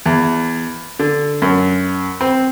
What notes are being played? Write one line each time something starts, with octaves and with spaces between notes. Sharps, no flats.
E2
D3
F#2
C4